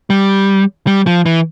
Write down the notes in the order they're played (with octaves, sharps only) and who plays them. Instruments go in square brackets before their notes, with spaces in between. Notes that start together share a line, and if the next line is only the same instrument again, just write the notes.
[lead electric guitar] G3
G3
F3
E3